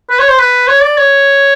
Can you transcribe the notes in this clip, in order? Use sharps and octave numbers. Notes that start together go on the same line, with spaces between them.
B4
C#5
C5
B4
C#5
D5
C#5